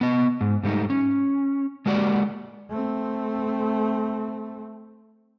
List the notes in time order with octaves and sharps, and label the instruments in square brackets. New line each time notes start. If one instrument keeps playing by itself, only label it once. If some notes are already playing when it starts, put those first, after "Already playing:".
[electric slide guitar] B3 D#5
G#2
G#2 G3 A3 D#4
C#4
G#3 A#3 F#4 G4 D5
[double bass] A3 C4